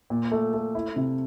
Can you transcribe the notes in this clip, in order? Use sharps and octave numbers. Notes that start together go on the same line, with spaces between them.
A#2
A3
A3
E4
C3